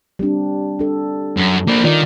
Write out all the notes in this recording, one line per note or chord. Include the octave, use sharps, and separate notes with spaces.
G3 C4 D4
D4 A4
F#2
A#3 D4
D#3 F4 D5